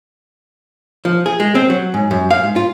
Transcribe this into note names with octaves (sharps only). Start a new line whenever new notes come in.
F3
G#4
G#3
C4
F#3
G#2
F#2
F5
G#2
F4